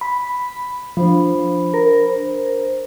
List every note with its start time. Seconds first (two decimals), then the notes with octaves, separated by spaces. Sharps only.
0.01 B5
0.97 F3 D4 C5 B5
1.74 A#4
2.10 C5